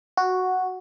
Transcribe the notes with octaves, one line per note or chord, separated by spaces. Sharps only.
F#4